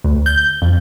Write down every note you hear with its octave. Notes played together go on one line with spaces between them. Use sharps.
D2
G6
F2